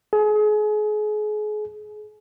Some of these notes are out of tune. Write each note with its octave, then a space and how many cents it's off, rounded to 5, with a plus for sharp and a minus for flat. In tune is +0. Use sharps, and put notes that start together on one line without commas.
G#4 +35